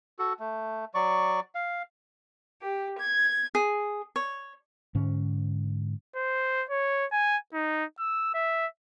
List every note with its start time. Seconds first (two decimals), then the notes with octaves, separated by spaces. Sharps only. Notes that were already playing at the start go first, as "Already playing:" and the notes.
0.19 F#4 A4
0.40 A3
0.94 F#3 D5 C#6
1.55 F5
2.61 G4
2.99 G#6
3.55 G#4
4.16 C#5
4.95 G#2 D3 C#4
6.16 C5
6.70 C#5
7.12 G#5
7.53 D#4
7.99 E6
8.34 E5